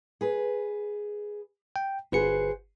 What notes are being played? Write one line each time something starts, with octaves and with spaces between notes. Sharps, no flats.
G#4 B4
G5
G1 F#4 G#4 B4 C5 C#7